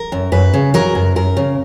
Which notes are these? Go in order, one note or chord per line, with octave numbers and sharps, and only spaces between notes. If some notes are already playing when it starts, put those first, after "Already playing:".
Already playing: A#4
F#2
F#2 B4
C#3
F#3 A#4
F#2
F#2 A#4
C#3